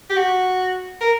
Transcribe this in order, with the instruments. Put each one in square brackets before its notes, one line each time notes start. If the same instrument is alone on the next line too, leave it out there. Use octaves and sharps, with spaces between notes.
[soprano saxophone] G4
F#4
A#4